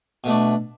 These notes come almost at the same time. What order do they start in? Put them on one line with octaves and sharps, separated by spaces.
B2 A3 D4